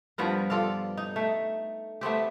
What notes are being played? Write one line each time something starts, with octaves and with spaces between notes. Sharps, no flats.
G2 F3 B3 A#4
F4 A4 D5 F5
D#4
A3
A3 B3 C4 G4